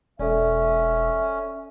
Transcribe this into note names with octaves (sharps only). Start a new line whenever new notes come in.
E1 C#4 A4 D5 E5